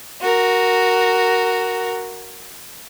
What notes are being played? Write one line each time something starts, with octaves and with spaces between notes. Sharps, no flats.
F#4 A#4